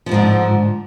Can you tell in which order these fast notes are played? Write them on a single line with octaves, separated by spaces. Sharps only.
F3 F2 G#2 D3